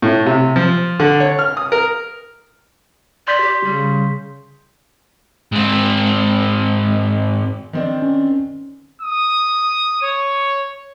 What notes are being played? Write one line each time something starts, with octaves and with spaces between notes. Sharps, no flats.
A2
C3
F3
D3
C#5
F6
D#6
A#4
D5 C6 G6 B6
G4
C#3 G3
G#2 C4
D#3 C4 D4
C#4
D#6
C#5